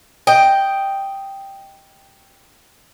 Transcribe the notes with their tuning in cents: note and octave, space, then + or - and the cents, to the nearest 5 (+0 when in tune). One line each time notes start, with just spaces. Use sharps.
D#5 +0 G5 +0